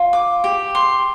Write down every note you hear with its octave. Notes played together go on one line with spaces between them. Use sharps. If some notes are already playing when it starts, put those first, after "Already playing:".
Already playing: F4
D6
G4
C6